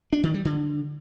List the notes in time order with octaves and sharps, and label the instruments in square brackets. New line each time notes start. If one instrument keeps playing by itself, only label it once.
[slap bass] D4
D#3
G3
D3